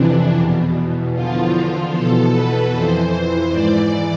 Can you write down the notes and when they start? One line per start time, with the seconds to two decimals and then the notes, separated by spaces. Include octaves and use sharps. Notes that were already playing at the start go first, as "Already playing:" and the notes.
Already playing: F2 C3 E3 D4
0.34 E2 B2
1.13 E2 D3 F3 F4
1.54 F4
1.93 E2 B2 A4
2.33 B4
2.72 F2 E3 C5
3.12 C5
3.52 G#2 E3 D5